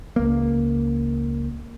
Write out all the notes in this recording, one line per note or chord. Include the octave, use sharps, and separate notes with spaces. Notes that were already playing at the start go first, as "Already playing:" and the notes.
C#2 A#3